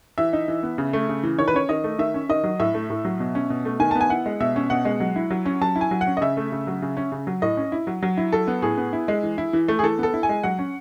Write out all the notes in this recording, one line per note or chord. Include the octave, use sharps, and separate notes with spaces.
E3 E5
D#4
E3
B3
C#3
A3
C#3
E3
D#3 C#5
B4
C#4 C#5
D#3 D#5
A3
D#3 E5
C#4
D#3 D#5
F#3
A2 E5
A3
A2
F#3
B2
C#4
B2
A3
D#3 G#5
B3 A5
G#5
E4 F#5
G#3
B2 E5
C#4
B2 F#5
G#3
F#3
E4
F#3
C#4
F#3 A5
E4
G#5
F#3
F#5
C#4
D#5
C#3 E5
A3
C#3
F#3
C#3
C#4
C#3
F#3
A2 D#5
C#4
E4
F#3
F#3
E4
F#3 A4
B3
A2 G#4
B3
E4
G#3
E3
E4
E3
A3
G#4
E3 A4
B3 A4
E4
G#5
G#3
F#3 F#5
C#4